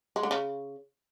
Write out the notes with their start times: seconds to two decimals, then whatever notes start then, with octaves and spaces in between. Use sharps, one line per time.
0.16 G#3
0.23 D3
0.31 C#3